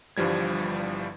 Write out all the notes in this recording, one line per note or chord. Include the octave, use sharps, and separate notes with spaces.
G1 G2 E3 F3 G3 G#6